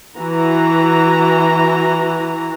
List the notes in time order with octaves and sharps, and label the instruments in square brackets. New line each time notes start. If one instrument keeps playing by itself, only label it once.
[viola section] E3 F#4 A#5